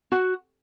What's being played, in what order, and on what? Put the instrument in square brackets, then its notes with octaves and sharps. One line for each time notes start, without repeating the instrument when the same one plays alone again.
[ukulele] F#4